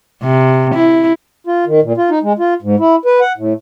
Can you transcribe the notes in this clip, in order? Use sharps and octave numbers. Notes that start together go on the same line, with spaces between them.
C3
E4
F4
D#3
A#2
F4
D#4
G#3
F4
G#2
E4
B4
F#5
A2